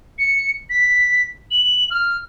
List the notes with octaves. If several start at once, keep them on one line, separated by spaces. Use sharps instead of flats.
C#7
B6
F#7
F6